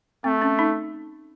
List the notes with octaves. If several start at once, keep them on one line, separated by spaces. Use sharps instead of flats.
A3 C4
C#4
D#4